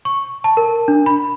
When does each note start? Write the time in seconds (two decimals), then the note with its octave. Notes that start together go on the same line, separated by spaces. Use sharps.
0.05 C#6
0.44 A5
0.57 A#4
0.88 D4
1.06 B5